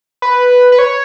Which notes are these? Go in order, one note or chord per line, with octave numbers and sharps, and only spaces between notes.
B4
B4
C#5